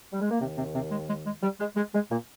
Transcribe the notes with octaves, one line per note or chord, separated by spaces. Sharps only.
G3
G#3
A#3
D#2 C3 D#3 C4
C3 C4
C3 C4
G#3
G#3
G#3
G3
G#3
G#3
G#3
A#2 A#3